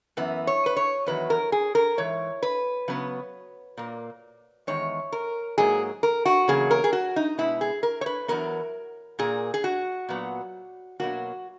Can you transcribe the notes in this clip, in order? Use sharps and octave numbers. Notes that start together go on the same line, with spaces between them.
F#2 E3 B3
C#5
B4
C#5
E2 D#3 F#3 B4
A#4
G#4
A#4
G#2 E3 C#5
B4
C#3 F#3 B3
A#2 A#3
E2 D#3 G#3 C#5
A#4
G#2 F#3 A#3 G#4
A#4
F#4
E2 C#3 F#3 A#3 G#4
A#4
G#4
F#4
D#4
B2 G#3 B3 E4
G#4
A#4
C#5
B4
E2 D#3 F#3 B3 A#4
A#2 A#3 G#4
G#4
F#4
A#2 F#3 B3
B2 F#3 A#3 F#4